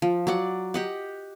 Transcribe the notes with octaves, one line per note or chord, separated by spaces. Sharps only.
F3
F#3 D5 F#5
G4 D#5 F#5